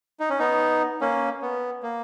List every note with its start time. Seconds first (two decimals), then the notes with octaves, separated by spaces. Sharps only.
0.20 D#4
0.30 C#4
0.39 B3 D#4
1.01 A#3 C#4
1.42 B3
1.83 A#3